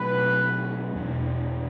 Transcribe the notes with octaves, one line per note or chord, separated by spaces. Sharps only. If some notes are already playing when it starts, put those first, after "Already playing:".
Already playing: B2 F#3 A3 C4 B4
E2 B2 A3 D4